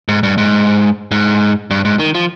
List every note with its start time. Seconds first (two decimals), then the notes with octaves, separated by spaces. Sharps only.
0.08 G#2
0.23 G2
0.38 G#2
1.11 G#2
1.71 G2
1.85 G#2
1.99 D#3
2.15 F3